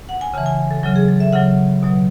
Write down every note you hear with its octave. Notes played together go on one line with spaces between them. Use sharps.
F#5
G#5
C#3 E3 A5
G#5
A4
C#3 F#3 A4
G#4
A4
E5
C#3 F#3 F#5
B2 F#3